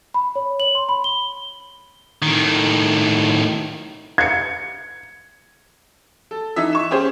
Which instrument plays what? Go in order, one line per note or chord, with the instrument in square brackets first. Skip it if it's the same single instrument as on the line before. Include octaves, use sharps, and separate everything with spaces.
[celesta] B5
C#5
F#7
C6
B5
G7
[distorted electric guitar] A2 D#3
[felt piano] G#6 C#7
[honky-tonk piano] A4
E3 D#4 E5
C#6 E7
C#4 G4 G#4 C5